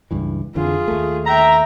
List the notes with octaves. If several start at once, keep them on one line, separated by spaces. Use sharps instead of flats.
C#2 G2 E3
F2 D3 E3 F4 G#4
D#2 A3
E5 G5 A#5